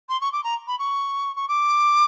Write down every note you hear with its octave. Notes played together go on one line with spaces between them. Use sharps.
C6
C#6
D6
A#5
B5
C#6
C#6
D6